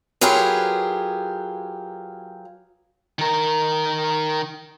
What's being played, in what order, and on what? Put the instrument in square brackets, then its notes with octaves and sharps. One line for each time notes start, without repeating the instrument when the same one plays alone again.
[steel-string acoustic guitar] F#3 F4 G4 G#4 A#4 B4
[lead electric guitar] D#3 A#4